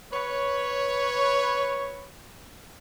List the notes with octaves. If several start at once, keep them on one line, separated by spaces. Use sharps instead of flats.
B4 C#5